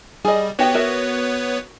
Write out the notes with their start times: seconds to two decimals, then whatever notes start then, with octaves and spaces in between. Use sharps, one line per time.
0.25 G3 G#4 D#5
0.59 B3 F#4 G4 B4 C#5 G5
0.74 F#4 A#4 E5